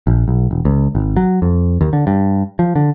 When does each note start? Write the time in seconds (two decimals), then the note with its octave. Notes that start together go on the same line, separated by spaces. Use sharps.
0.07 A#1
0.28 B1
0.51 E1
0.65 C#2
0.95 G#1
1.16 F#3
1.42 F2
1.81 D#2
1.93 D3
2.07 G2
2.59 F3
2.76 D3